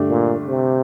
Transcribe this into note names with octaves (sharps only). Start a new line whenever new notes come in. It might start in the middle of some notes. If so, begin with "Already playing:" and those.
Already playing: G2 D3 A3 D4 G4
A#2
C3